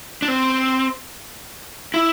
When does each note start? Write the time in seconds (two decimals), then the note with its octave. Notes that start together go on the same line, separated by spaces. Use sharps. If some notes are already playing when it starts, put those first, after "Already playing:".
0.22 D4
0.28 C4
1.94 E4